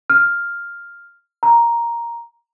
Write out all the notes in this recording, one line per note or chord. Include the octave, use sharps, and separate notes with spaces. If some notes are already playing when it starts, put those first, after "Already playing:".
F6
A#5